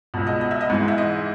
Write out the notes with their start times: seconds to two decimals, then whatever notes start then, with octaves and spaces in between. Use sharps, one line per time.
0.14 C#2 B2
0.27 D#5
0.41 D#5
0.51 E5
0.61 D#5
0.70 G#2 E3
0.88 E5
0.98 D#5